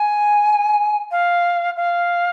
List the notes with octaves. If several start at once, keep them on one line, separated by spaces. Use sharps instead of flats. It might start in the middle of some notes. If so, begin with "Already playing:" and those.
Already playing: G#5
F5
F5